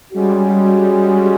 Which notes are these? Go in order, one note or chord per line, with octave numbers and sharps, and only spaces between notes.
G3 G#3 C#4 F#4